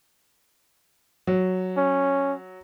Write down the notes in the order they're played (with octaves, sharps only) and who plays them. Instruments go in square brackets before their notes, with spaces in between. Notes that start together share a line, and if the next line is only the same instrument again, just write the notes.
[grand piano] F#3
[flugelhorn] C#4